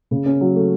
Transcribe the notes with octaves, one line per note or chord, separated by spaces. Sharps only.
C#3
C#4
F#3
A3